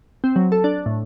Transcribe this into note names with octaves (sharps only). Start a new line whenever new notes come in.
C4
F#3
A4
D4
A2